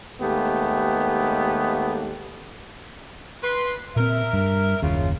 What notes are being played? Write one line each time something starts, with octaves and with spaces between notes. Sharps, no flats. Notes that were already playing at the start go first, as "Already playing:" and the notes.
D#2 G#3 A3 B3 G4
B4 C6
A#2 C4 A#4 E5
G2
F#1 D#2 C#3 F4